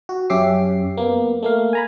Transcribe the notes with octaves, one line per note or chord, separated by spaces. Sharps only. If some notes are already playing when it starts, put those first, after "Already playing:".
F#4
F#2 C#4 G4 E5 D6 C7
A#3 B3
A3 A#3 F5
G#5 A#5 B5